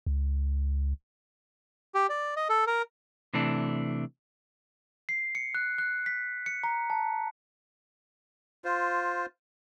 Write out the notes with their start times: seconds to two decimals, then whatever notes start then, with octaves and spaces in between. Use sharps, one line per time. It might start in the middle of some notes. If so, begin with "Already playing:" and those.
0.06 C#2
1.95 G4
2.09 D5
2.37 D#5
2.49 A4
2.67 A#4
3.34 C3 E3 A3 D4
5.09 C7
5.35 C#7
5.55 F#6
5.78 F#6
6.06 B6
6.46 C#7
6.64 A#5
6.90 A5
8.64 F4 C5